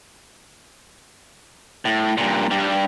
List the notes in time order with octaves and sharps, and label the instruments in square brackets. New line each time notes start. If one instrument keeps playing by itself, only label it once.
[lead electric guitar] A2
G2 A#2
G2 G3